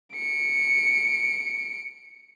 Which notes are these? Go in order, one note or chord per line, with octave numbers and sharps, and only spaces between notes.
C#7 D7